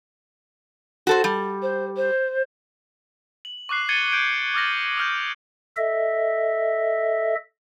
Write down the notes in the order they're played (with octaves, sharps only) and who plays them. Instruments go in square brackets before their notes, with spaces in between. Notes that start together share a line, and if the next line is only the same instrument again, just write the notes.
[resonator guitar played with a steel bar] F#4 A4 C5
G3
[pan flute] C5
C5
[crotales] F#7
C#6 D6 F#6 C7
G#6 A6 C#7 D#7 G7
G6 D7
D6 D#6 F6 A6 A#6 F#7
D#6 F6 G6
[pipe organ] A4 D#5 E5